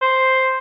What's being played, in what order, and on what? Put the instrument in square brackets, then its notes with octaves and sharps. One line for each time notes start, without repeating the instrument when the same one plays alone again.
[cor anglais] C5